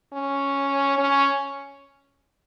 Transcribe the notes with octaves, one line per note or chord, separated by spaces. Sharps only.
C#4
C#4